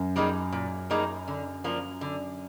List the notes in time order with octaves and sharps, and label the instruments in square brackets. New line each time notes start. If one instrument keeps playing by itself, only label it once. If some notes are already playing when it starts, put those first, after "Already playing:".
Already playing: [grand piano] F#2
[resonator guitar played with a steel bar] G3 A#3 D#4 G#4
A#2
G3 A#3 D#4 G#4
D3
F3 A#3 D4
D3